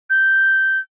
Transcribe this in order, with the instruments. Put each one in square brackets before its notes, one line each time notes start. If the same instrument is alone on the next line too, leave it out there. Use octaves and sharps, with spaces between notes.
[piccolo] G6